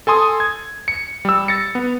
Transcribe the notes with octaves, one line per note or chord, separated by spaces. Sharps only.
A4 G#5 C6 D#6
G#6
C#7
G3 E6
A6 A#6 C#7
B3